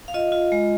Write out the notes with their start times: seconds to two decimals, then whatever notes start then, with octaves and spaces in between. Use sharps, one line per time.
0.08 F5
0.14 F4 D#5
0.32 F4
0.52 G#3